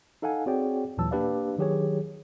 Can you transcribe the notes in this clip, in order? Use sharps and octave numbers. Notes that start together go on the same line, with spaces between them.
D#4 A4 F5 F#5 G#5
C4 F#4 G#4 C#5 D5 G5
D#2 A#2 E3 F#3 A5 E6
A#3 D4 G4 B4 D5 F5
D#3 F#3 G4 G#4 C#5